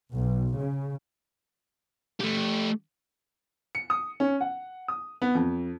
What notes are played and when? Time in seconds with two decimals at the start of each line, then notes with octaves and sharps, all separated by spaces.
0.13 B1
0.59 C#3
2.20 A3 G4
3.75 C#7
3.90 D#6
4.20 C#4
4.41 F#5
4.88 D#6
5.22 B3
5.35 F2